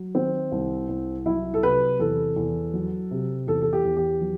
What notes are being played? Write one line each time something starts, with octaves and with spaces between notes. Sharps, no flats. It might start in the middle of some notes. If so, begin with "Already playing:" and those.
Already playing: F#3
D#3 C4
C2
C2
F#3 E4
A4
C3 B4
E2 A4
E2
F#3
C3
E2 A4
A4
G4
E2
G4
F#3